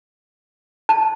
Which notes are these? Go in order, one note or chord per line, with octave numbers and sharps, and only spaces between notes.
A5